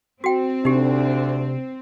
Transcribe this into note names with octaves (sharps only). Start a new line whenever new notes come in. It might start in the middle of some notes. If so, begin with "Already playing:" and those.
C4 F#4 G5
D2 C3 D4 D#4 G4